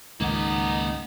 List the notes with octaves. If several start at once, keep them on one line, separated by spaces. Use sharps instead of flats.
C#2 G#2 D#3 A#3 D#4 F#5